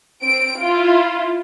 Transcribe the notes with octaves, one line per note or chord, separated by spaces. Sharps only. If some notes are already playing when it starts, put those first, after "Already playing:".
C4 D7
E4 F4